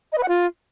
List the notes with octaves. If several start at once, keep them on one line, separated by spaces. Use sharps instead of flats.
D#5
B4
F#5
F4